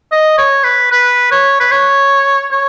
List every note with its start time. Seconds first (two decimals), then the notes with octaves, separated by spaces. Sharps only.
0.12 D#5
0.38 C#5
0.64 B4
0.91 B4
1.32 C#5
1.60 B4
1.72 C#5
2.52 C#5